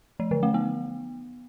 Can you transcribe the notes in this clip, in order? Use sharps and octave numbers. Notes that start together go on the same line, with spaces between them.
F3
D3
A3
B3